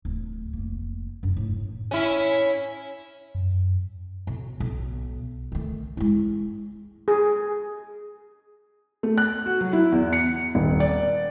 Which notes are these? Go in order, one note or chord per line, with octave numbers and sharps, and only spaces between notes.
D1
F1 A#3
F#2 D#4
A2
C#4 E4
F#2
B1
B1
D#3 A3
G#3 E4
G#4
A3
F#6
F#4
F#3
E4
E2
C#7
D#1
D5